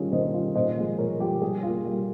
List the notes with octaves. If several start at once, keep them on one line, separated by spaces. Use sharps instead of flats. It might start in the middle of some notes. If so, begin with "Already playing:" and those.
Already playing: D#3 G3 C#4 F4 G#4
D#3 C5 D#5
G3 C#4 F4
A#2 C5 D#5
F3 G#3
A#2 A#4 C#5
F3 G#3 G4 A#4
G3 G#4
A#3 F4
G3